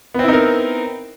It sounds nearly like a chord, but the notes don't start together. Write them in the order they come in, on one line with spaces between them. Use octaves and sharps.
B3 C4 E4 D#4 A#4